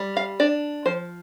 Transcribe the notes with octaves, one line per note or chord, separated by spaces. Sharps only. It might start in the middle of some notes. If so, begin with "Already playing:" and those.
Already playing: G3
F5
D4 D5
F3 C5